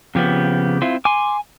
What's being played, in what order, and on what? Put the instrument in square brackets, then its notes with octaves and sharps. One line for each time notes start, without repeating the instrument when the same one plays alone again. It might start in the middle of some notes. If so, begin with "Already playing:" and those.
[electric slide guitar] F2 F3 B3 [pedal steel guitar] C#3 G4
[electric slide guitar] C4 E4 F4
[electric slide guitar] G#5 [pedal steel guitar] C6 D6